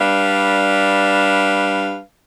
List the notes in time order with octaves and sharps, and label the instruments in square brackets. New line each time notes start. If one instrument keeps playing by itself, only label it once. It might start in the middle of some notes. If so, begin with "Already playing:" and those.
[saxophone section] G3 D4 B4 F5